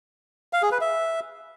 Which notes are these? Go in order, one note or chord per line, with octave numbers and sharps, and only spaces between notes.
F5
G#4
B4
E5